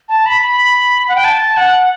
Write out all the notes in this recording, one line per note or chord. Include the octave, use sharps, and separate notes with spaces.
A5
B5
B5
F#5
G5
A5
F#5